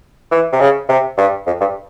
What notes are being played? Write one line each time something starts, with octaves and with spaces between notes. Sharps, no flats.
E3
C3
C#3
C3
G2
F2
G2